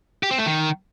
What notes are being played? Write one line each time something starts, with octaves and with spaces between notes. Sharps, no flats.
G4
C4
A3
D#3